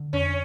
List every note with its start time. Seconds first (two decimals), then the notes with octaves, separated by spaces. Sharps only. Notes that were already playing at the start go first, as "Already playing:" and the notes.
Already playing: D3
0.13 F2 C#4